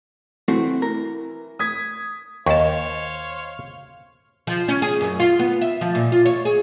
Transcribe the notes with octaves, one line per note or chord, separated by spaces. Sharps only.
E3 A3 C4 F#4
A#4
D#6 G#6 B6
D#2 C5 C#5 D#5 F5 A5 C#6
F3
C#4
G#4
F#2
F4
B3
E5
F3
A#2
F4
C#5
G#4